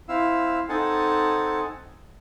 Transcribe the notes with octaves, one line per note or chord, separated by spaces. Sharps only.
C4 E4 F5 E6
C4 D#4 A4 F#5 G#5 A5